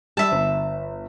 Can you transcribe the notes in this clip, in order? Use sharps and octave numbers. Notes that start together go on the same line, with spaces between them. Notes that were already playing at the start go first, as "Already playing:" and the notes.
G3 E5 A5
G1